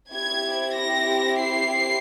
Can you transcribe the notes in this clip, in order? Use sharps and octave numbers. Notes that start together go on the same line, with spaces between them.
C4 E4 G4 G#6
A#6
C7